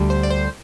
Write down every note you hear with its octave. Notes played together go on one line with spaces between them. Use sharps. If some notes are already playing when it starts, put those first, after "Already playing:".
Already playing: D2 D3 G3
C5
D5
C5